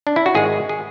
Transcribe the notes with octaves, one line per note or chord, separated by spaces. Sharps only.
D4
E4
F#4
G#1 G#2 G#3 G#4
G#4